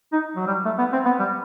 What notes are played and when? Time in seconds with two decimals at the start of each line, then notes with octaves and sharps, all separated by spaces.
0.13 D#4
0.36 F#3
0.47 G3
0.65 A3
0.79 B3
0.93 C4
1.05 B3
1.19 G3